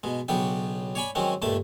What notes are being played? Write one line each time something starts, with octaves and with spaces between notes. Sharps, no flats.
B2 G#3
B1 C#3 F#3 B3 D4 G5
C#5 D5 G#5 B5
D#3 F#3 G#3 C4 C#4
C#2 G2 A#2 A3 A5